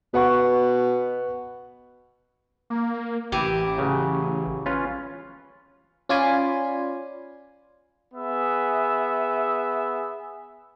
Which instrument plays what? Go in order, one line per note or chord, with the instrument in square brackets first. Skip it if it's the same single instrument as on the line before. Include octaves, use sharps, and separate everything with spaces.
[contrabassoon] B2 [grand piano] B4 F#5 C#6
[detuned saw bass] A#3
[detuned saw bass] A1 [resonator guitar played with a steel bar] E3 G4
[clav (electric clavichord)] C#3 F#3
C#4 F4 B4
[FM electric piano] C#4 F4 D5 G#5 B5 C6
[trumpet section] B3 G#4 E5